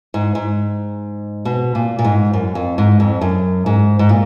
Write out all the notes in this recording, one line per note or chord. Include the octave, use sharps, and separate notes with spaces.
G#2
G#2
B2
A#2
A#2
G#2
F#2
F2
G#2
F2
F#2
G#2
G#2
A#2